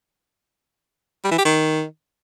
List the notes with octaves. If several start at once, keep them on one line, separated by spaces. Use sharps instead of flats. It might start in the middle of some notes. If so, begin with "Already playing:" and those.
G3
E3
G4
D#3